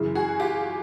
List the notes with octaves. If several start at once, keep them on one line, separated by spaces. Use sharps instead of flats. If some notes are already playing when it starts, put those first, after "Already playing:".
Already playing: F#2 C#3 E3
F#4 G#4
F4 G4